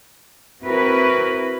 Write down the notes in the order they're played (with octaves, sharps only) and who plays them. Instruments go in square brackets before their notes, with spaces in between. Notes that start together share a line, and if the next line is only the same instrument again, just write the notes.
[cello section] C4 E4 F#4 A#4 B4